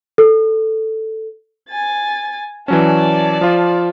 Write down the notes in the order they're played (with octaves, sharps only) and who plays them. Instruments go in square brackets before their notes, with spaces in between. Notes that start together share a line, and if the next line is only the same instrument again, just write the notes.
[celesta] A4
[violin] G#5 A6
[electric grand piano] E3 F#3 C#4 [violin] D5 A5
[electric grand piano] F3 F4